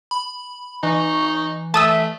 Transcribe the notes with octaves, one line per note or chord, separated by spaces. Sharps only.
B5
E3 D#4 C#6
A3 E5 A5 D#6 E6